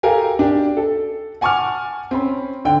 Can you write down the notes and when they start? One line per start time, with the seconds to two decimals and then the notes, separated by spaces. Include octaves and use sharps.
0.03 G4 A4 A#4 F5 G#5
0.39 D4 G4
0.77 A4
1.41 F#5 G#5 A5 C#6 D6 F6
2.11 C4 C#4 B5
2.65 D3 G5